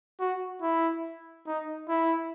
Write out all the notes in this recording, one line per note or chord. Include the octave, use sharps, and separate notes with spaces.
F#4
E4
D#4
E4